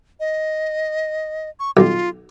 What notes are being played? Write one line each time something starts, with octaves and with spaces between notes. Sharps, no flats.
D#5
C#6
B1 F4